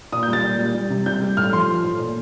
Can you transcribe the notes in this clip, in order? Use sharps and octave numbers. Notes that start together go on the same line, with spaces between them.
A#2 D#6
G6
G3 A6
A#2
G3
G3
C3
G3 G6
G3
A2 F6
F3 C6
F3
A2
A#2